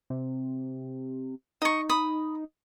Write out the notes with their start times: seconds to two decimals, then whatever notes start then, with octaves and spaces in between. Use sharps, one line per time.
0.10 C3
1.62 D#4 D#5 C#6
1.89 B5 D#6